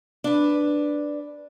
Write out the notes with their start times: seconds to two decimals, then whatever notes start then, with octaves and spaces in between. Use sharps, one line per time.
0.24 D4 B4